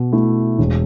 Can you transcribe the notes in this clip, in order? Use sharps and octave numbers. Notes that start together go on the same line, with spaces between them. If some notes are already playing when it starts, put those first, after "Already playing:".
Already playing: B2
A3 E4
E1